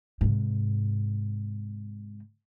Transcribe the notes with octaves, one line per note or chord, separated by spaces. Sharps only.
G#2 C3